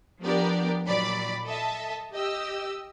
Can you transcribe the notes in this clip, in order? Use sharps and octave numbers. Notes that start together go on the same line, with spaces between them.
F3 B3 D4 G4 A#4 D5
A#2 D#3 F#3 D5 B5
A4 D#5 E5 A5
G4 D#5 E6